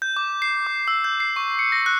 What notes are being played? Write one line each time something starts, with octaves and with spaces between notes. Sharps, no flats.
G6
D6
C7
D6
E6
G6
C7
C#6
C#7
A#6
F#6